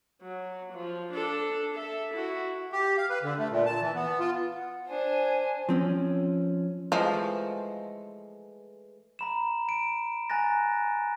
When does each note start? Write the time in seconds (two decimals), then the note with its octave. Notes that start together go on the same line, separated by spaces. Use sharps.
0.22 F#3
0.73 F3
1.13 D4 A4
1.74 A4 E5
2.14 E4 F#4
2.73 G4
2.98 F5
3.10 B4
3.23 D3
3.39 A3
3.51 A#2
3.66 A5
3.81 E3
3.95 B3
4.20 F4
4.50 F#5
4.88 D4 C5 G#5
5.69 F3 C4 C#4
6.92 E3 F3 G#3 A3
9.19 A#5 B5 E7
9.69 D7
10.30 G#5 A#5 F#6 A6 A#6